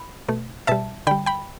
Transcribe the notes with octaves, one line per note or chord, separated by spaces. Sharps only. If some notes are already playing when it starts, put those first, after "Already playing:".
Already playing: B5
B2 A3
B2 G3 E5 A5
D3 G3 G5 B5
G5 B5